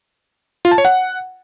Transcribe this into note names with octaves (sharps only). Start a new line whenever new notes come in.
F4
A5
C#5
F#5